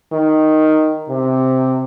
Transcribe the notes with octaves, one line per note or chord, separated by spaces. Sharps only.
D#3
C3